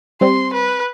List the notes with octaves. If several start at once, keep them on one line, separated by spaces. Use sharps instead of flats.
G3 C4 C6
B4